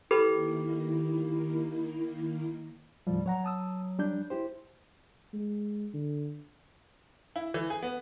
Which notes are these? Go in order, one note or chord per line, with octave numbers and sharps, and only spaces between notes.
D#3 A#3 E4 G4 A4 B4 B5
D#2 A2 F3 G3
F#3 C#5 F#5 A#5
A5 D#6 E6
G3 D4 G6
E4 G4 C5
G#3
D3
E4
E3
G#4
B3